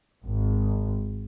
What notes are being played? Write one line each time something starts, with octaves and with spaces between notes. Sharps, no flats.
G#1